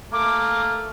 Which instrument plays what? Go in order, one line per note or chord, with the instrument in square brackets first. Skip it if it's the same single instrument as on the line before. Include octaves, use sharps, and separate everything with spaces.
[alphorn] A3 [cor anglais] A#3 [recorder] D6